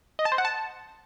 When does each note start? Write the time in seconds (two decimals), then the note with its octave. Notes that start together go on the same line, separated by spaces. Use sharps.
0.19 D#5
0.25 A5
0.32 C5
0.38 F#5
0.45 A5